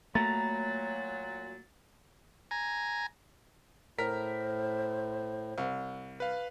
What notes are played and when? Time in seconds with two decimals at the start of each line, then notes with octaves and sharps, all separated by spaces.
0.15 A#2 F#3 A3 A#3 A#5 B5 A6
2.51 G#5 A#5
3.99 A2 A#4 C5 B6
5.58 C2
6.20 B4 F5